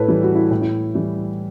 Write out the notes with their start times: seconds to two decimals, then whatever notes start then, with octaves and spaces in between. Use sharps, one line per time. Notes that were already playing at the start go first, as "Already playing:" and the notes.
Already playing: A2 A4 B4 C#5
0.08 E3 G3
0.23 F#4
0.35 E4
0.51 A2
0.61 E4
0.95 E3 G3